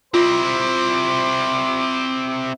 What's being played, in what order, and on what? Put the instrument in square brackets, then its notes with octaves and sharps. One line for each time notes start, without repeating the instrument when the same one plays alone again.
[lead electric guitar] C4 E4 [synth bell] F4 [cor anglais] C5 [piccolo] D6